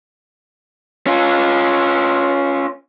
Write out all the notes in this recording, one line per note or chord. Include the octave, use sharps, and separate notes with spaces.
C#4 F4